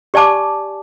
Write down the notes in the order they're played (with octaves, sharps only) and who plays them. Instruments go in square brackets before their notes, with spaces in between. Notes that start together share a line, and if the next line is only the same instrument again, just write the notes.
[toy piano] G4 D5 G#5 A5 D6